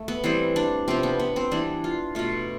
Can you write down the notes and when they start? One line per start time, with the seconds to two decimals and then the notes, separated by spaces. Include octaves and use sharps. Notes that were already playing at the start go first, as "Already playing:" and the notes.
Already playing: A3
0.08 B3
0.24 E3 G3 B3 C4
0.56 D4
0.88 C3 F3 B3 C4
1.03 B3
1.19 B3
1.36 C4
1.51 E3 G3 B3 D4
1.84 F4
2.15 B2 A3 F4